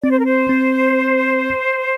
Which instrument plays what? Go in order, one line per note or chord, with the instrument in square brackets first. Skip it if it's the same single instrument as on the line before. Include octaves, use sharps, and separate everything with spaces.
[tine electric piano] C4 [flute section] D5
[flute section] C5
A#4
C5
[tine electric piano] C4